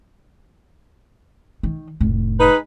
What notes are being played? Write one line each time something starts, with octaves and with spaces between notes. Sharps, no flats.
D#3
F1 A2
D#4 G#4 B4